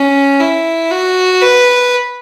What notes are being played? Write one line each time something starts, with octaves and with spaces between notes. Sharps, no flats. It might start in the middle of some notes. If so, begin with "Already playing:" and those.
Already playing: C#4
E4
F#4
B4